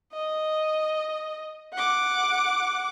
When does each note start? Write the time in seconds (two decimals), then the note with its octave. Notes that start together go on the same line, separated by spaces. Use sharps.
0.13 D#5
1.73 F#5 D6